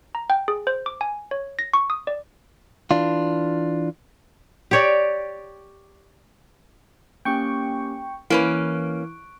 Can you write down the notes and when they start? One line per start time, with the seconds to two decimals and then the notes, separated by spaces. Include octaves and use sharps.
0.15 A#5
0.30 G5
0.48 G#4
0.67 C5
0.86 D6
1.01 G#5
1.31 C#5
1.59 A#6
1.74 C#6
1.90 D#6
2.07 D5
2.91 E3 D4 F4
4.71 G4 C#5 D5
7.25 A#3 C#4 G4 G5 C#6
8.30 E3 A#3 C#4 B4 C#6 F#6 D7